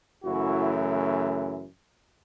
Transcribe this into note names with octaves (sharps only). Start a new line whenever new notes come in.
F#2 C#3 E3 A3 E4 F#4